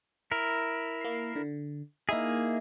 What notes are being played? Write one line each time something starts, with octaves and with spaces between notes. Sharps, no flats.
E4 A#4
A#3 C7
D3
A#3 D#4 E4 G#4 E5